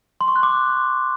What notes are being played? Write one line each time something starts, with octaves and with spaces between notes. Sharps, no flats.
C6
C#6
F#6
D6